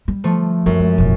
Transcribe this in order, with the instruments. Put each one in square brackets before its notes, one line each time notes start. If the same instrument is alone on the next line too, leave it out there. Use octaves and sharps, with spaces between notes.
[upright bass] G3
[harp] F3 A3
[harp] F#2 [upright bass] E3 G3
[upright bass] G#3
E1 A1